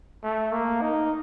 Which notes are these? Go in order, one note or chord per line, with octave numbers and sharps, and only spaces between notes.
A3
A#3
D#4